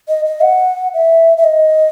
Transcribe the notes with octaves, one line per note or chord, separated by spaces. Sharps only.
D#5
D#5
F#5
E5
E5
D#5